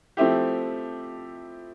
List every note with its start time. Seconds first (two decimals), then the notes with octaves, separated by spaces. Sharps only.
0.17 F3 A3 C4 E4 G4